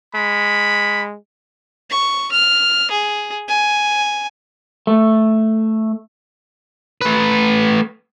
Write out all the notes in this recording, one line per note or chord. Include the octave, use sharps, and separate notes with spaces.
G#3 B5
C#6
F6
G#4
G#5
A3
A3 B4